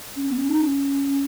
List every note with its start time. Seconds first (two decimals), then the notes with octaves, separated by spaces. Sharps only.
0.16 C#4
0.30 B3
0.38 C#4
0.49 D#4
0.61 C#4